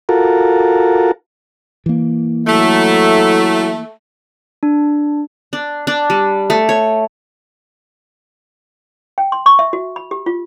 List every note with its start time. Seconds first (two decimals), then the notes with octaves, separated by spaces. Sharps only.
0.09 F4 F#4 A4 A#4
1.86 E3 A#3
2.47 F#3 A3 E4
4.63 D4
5.53 D4
5.87 D4
6.10 G3
6.50 A3
6.69 C#5
9.18 G5
9.32 C6
9.46 C#6
9.59 E5
9.73 F#4
9.96 B5
10.11 G4
10.26 F4